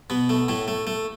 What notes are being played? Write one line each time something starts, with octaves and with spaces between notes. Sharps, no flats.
B2 B3
A3
A2 A3
A3
A3